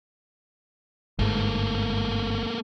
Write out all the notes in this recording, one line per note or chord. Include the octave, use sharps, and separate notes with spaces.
G1 G#2 A3 A#3